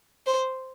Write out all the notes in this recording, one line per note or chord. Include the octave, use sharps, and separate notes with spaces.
C5